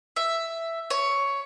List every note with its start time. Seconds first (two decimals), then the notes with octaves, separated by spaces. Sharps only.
0.16 E5
0.90 C#5